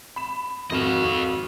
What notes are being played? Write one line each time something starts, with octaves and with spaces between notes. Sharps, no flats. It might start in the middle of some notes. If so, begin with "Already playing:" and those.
B5 E7
G#1 F2 F#4 D#5 F5 E7